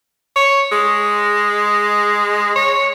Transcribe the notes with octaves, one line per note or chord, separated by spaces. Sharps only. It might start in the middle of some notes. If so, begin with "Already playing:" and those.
C#5
G#3
C#5